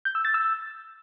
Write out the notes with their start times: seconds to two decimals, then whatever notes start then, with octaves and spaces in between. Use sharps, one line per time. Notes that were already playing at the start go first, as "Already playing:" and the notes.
0.05 G6
0.15 E6
0.25 A6
0.34 E6